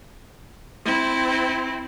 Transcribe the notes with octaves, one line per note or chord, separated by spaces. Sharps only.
C4 E4